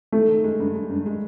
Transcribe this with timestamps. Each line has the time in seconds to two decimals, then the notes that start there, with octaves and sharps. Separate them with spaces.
0.12 D#3 A3
0.28 D#3
0.44 G#3
0.60 G2
0.75 G#3
0.91 G2
1.06 G#3